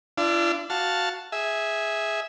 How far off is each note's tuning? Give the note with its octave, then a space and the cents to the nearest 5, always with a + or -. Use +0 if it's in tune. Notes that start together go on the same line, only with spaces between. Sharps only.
D4 +0 F4 -45 E6 +0
F#4 +0 F5 +0 A5 +0
G#4 +0 E5 -10